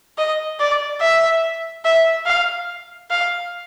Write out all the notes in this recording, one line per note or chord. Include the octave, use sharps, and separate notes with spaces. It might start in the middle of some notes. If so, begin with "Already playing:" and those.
D#5
D5
E5
E5
F5
F5